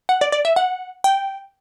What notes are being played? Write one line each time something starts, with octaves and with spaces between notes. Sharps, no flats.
F#5
D5
D5
E5
F#5
G5